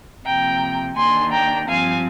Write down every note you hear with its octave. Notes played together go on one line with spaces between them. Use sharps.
C3 F3 A#3 G5 A#5
D#2 D#3 A#3 D4 G#5 C6
G5 A#5
G2 F3 C4 F5 G#5